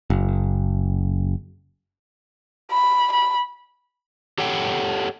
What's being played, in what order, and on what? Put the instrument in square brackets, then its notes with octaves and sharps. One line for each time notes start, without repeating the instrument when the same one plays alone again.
[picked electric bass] F#1
[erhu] B5
B5
[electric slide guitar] G4 A4 C#5 F#5 G5